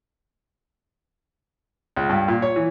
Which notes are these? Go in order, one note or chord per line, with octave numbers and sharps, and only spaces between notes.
C#2
G2
A#2
C#5
E3